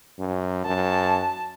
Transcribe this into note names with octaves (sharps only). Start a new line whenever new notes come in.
F#2
F#2 A5